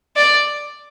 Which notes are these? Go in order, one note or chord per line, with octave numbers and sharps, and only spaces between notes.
D5